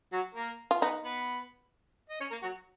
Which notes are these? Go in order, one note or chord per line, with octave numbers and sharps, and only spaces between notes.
F#3 F#4
A#3 A#4
F4
B3 D#4 B4
B3 B4
D#5
C#4 C#5
A#3 A#4
F#3 F#4